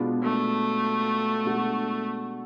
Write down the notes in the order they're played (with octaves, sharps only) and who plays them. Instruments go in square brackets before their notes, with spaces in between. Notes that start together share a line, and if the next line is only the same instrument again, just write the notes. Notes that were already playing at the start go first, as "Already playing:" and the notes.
Already playing: [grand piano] B2 G#3 B3 D4 F4
[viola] A3
[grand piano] B2 G#3 D4 F#4